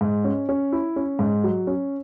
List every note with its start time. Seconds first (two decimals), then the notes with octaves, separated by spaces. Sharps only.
0.01 G#2
0.24 C#4
0.49 C#4
0.73 E4
0.96 C#4
1.19 G#2
1.44 F#3
1.67 C#4